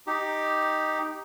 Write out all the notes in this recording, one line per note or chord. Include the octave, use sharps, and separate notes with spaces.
D#4 G4